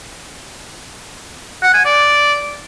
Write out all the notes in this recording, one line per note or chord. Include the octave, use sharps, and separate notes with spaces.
F#5
G#5
D5